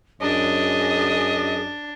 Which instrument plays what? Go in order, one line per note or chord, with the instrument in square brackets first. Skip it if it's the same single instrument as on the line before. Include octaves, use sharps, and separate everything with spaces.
[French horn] F#2 [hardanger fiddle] D4 [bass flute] G#4 [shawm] D#5